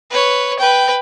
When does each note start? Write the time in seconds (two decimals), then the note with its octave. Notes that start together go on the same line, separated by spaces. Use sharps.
0.11 B4 C#5
0.59 B4 G5